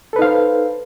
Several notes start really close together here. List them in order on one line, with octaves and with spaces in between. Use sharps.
A4 B4 D#4 F5 C5